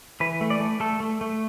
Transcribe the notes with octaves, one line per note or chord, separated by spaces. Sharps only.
E3 B4
A3
D5
A3
A3 A4
A3
A3